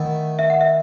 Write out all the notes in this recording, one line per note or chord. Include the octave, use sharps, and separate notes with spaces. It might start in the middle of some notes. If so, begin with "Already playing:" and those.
Already playing: D#3 A3 E4 F#5
E5
F#5
E5